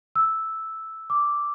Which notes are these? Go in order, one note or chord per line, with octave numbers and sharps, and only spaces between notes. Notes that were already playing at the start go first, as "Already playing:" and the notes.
E6
D6